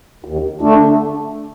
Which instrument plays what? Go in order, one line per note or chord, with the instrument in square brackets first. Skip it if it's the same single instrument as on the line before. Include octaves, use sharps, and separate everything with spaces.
[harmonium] D#2
D3 A3 D4